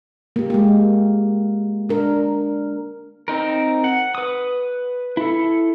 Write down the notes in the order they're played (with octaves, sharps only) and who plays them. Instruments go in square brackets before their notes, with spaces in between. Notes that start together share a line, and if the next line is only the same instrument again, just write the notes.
[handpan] A#3 G4
G#3 G4
D4 A#4
[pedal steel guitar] C4 D#4 A#4
F#5
B4 D#6
E4 A4